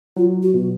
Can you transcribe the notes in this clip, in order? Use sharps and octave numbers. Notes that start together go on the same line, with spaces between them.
F#3 F4
F#4
B2